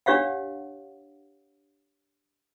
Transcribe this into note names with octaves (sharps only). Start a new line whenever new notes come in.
D4 G4 C#5 F5 F#5